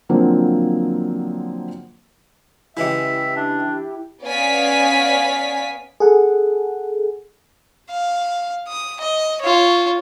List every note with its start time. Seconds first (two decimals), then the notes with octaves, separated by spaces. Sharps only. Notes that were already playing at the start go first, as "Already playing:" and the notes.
0.09 D3 F3 F#3 A#3 C4
2.77 C#3 E3 G#3 E4 G4 E5
3.36 D4
4.24 B3 C#4 D5 F5 G#5 B6
6.00 G#4 A4 F#5
7.90 F5
8.68 D#6
9.00 D#5
9.41 F4 C#5